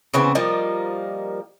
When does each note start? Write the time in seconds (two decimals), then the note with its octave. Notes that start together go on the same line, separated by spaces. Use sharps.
0.14 C#3 E3 B3 C4
0.35 F3 G3 A#3 D#4